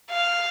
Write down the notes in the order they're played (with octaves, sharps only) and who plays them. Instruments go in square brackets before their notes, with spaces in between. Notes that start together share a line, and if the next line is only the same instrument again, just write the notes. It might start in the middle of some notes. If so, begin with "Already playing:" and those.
[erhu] F5